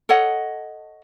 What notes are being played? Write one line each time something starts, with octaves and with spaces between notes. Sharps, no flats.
A4 C#5 D#5 F#5